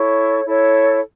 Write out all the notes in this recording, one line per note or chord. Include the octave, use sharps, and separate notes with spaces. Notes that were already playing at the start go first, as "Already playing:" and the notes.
Already playing: E4 A4 C#5 C#6
E4 A4 C#5